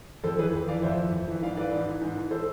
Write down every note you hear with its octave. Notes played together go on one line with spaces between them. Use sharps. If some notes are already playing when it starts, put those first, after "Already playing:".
F2 A4 C5
E3 G#4 B4
F2
E3 D5 F5
F2 C5 E5
E3
F2
E3
G#2 D5 F5
E3 B4 D5
G#2
E3
G#2
E3
A4 C5